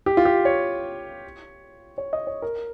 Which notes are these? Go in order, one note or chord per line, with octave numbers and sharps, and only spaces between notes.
G4
F4
G4
C#5
C#5
D#5
C#5
A#4